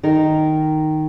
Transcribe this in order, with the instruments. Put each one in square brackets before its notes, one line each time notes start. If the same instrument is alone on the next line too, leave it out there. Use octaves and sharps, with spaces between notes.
[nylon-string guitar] D#3 D#4 A#4